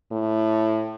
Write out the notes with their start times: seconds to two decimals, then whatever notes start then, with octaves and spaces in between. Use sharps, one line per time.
0.11 A2